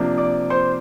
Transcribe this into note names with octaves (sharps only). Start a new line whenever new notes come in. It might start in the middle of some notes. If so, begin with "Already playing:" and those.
Already playing: C3 F3 A#3 D4
D5 D6
C5 C6